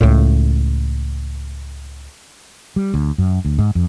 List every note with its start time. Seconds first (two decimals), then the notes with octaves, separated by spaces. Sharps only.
0.01 C#2 A2
2.76 G3
2.94 D2
3.18 F#2
3.45 D2
3.59 G#2
3.75 F2